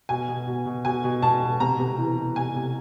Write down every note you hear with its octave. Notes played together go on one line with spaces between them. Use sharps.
B2 G#5
B2
B2
B2
B2 G#5
B2
B2 A5
B2
C3 A#5
C3
E3
E3
C3 G#5
C3